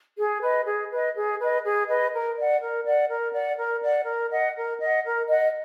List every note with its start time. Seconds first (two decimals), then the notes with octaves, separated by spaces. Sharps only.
0.17 G#4
0.41 B4 D#5
0.65 G#4
0.90 B4 D#5
1.14 G#4
1.39 B4 D#5
1.63 G#4
1.87 B4 D#5
2.12 A#4
2.36 D5 F#5
2.61 A#4
2.85 D5 F#5
3.09 A#4
3.33 D5 F#5
3.57 A#4
3.81 D5 F#5
4.06 A#4
4.30 D#5 F#5
4.55 A#4
4.79 D#5 F#5
5.04 A#4
5.28 D#5 F#5